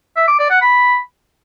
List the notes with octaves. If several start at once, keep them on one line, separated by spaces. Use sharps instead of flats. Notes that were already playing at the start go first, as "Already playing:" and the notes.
E5
D6
D5
F#5
B5